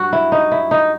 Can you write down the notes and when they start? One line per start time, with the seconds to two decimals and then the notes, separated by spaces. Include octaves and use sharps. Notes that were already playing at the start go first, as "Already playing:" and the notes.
Already playing: G2 F#3 F#4
0.13 E4
0.32 D#4
0.52 E4
0.71 D#4